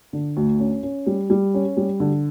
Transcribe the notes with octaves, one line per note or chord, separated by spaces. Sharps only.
D3
D2
C#4
C#4
G3
G3
C#4
G3
D3